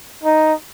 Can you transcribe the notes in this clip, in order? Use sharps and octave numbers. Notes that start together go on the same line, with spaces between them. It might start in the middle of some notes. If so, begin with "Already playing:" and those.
D#4